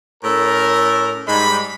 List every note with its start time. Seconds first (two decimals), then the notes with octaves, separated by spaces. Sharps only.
0.23 A2 C#4 A4 A#4
1.27 G#2 G3 G#3 D#4 B5